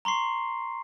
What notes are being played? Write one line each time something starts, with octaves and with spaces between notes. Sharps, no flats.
A#5 C6 C#6 C7